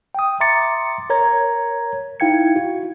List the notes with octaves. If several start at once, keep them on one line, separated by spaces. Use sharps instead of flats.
G5 D#6
E5 A#5 C6 D6 A6 C#7
A#4 C#5 A#5 G#6
D#4 E4 F5 G5 G#6 C#7
F#4